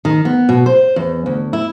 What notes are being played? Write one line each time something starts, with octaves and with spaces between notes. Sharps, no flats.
D#3
B3
B2
C5
E2
D2
E4